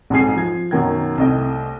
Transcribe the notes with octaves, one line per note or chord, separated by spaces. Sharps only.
B1 F2 G#2 G#4 G#5 C7
F3 G#6
F#2 B2 D#3 G5 G#6
C2 A3 D#5 G5